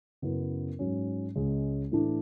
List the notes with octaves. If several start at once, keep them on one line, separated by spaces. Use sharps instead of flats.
F#2 C#3 F#3 B3 E4
G#2 F#3 C#4
C#2 C#3 G#3
A2 E3 A3 D4